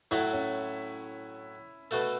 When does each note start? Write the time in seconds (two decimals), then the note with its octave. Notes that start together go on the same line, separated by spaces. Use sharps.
0.11 A2 F#3 A3 E4 F#4
0.33 C#4
1.91 B2 A3 F#4 A4